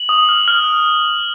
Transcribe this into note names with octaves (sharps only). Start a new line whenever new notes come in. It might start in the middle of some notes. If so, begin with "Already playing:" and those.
Already playing: F#7
D#6
F6
F6